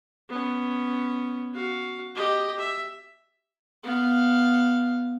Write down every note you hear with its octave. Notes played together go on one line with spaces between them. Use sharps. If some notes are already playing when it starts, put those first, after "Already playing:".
B3 C#4
F#4 F5
G4 D#5
E5
B3 F5